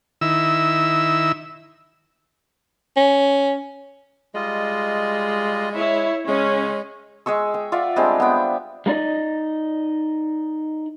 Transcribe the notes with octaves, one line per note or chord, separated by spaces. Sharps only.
D#3 E4 E6
C#4
G3 G#3 F4 D#5
E4 C#5
C#3 G#3 C#4
G#3 G#4 C#6 E6
G5
F4 D5 E5 F#5
G3 G#3 C4 D4
B3 G5
G#3 A#3 D#4 D5 D#5